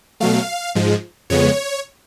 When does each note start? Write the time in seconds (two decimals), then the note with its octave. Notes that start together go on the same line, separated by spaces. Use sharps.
0.20 B2 F#3 A3 F5
0.75 G#2 F3 G#3
1.30 F2 C#3 G#3 B3 C#5